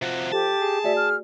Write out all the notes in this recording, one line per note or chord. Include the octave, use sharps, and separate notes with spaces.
C3 F3 F#4
G4 A4 A5
G#4
A3 F#4 D5 E5
F6